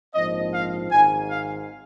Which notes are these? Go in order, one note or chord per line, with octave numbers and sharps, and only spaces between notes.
A#1 G#2 F3 C4 D#5
F5
G#1 G#2 G#3 G#5
F5